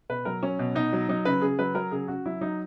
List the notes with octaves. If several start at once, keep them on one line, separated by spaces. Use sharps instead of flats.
B2 B4
F#3 A#4
F#3 C#4
B2
B2 D#4
F#3
F#3 D#4
C#3 B4
C#3 G#4
F#3 B4
F#3 A#4
C#3 G#4
C#3 F#4
F#3 E4
F#3 D#4